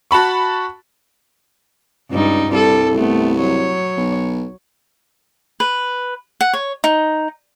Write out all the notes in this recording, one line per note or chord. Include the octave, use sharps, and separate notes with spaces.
F#4 A5 B5 C#6
C#2 G2 G3 D#4
C2 G3 A4
A3 B3
F#3 C#5
B1
B4
F#5
C#5
D#4